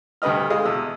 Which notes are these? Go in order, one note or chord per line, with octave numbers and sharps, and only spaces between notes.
D2 G2 G3 B4 D#5 F6
G#3 D#5 F5
E2 B2 E6